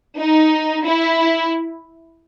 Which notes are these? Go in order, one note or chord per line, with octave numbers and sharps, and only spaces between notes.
D#4
E4